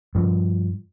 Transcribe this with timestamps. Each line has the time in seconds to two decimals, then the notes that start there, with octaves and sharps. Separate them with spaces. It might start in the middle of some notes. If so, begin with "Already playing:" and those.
0.15 G2 F3